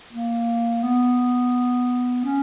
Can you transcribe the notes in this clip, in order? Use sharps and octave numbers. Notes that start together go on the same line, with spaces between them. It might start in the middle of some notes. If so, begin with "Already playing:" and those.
A#3
B3
C#4